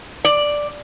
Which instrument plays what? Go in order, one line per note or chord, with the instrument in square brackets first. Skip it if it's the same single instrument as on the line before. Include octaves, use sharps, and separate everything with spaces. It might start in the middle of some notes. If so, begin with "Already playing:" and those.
[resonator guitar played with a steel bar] D5